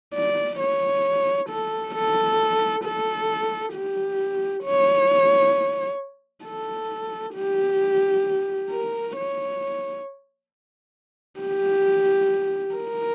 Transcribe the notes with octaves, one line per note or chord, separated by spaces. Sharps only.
D5
C#5
A4
A4
A4
G4
C#5
A4
G4
A#4
C#5
G4
A#4